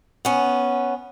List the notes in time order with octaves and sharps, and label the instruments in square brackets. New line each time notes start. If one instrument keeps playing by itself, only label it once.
[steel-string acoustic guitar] B3 C#4